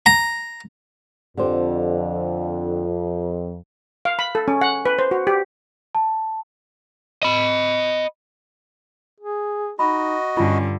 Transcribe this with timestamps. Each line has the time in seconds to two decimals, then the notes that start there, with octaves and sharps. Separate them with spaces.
0.06 A#5
1.37 F2 D3 G4 C5
4.05 F5
4.19 B5
4.35 A4
4.48 C#4
4.61 F#5
4.86 B4
4.99 C5
5.11 F#4
5.27 G4
5.95 A5
7.23 D#5 B5
9.20 G#4
9.79 D#4 F#4 D#5 B5
10.37 G2 D3 C#4 F4